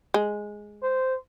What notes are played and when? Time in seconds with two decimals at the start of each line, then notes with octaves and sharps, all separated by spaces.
0.14 G#3
0.83 C5